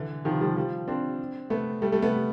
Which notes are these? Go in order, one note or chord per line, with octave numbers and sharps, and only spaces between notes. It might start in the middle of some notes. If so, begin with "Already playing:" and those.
Already playing: D3 E3
D#3 F3
F3 G3
F3 G3
C4 D4
A3 B3
G3 A3
G3 A3
A3 B3